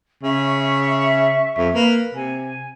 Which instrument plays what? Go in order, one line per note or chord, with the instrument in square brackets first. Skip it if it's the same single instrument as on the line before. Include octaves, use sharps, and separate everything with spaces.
[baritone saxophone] C#3 [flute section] E5 C#6
[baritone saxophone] F2
[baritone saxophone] A#3 [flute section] B4
[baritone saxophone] C3 [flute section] G#5